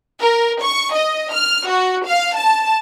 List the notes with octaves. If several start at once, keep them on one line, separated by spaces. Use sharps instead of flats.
A#4
C#6
D#5
F6
F#4
F5
A5